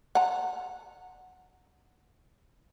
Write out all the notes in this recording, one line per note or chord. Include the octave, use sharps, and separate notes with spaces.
F#5 A#5